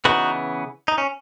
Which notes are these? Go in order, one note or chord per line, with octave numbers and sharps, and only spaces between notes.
C#3 E3 B3 D#4 F#4
D#4
C#4